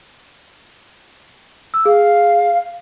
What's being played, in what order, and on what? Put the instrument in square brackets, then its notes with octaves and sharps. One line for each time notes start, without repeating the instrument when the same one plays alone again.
[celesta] E6
[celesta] G#4 [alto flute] F5